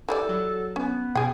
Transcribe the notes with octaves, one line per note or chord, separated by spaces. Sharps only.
E3 G3 A4 D5
F#3
B3 C#4
B2 G#4 G5